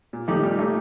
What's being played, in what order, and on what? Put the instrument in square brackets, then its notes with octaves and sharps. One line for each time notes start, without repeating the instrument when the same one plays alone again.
[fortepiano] A#2
[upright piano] F3 [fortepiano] A3 D#4 G4
[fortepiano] A#2 [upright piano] G3
[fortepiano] A3 D#4 G4